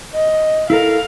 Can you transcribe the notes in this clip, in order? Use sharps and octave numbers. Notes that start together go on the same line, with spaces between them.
D#5
E4 A4 A#4 F5